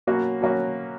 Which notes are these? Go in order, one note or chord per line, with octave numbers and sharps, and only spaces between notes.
B2 F#3 A#3 C#4 F#4
B2 F#3 A#3 C#4 F#4